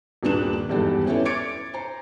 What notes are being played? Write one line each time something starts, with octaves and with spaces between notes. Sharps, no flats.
D#1 G2 A#3 D4 B4 E7
G#1 E2 G2 G4 A4
B3 C#4 E4 A4 C#5 D5
D6 G#6 A6 C#7 D7
C5 A#5